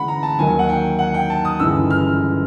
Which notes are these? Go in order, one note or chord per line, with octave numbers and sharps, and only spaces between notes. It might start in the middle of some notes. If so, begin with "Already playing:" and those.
Already playing: D2 C#3 E3 G#3 F#5 B5
A#5
A5
D#2 D#3 F#3 A#3 D#4 G#5
F#5
G5
F#5
G5
A5
D#6
G1 F#2 C#3 E3 G#3 E6
F6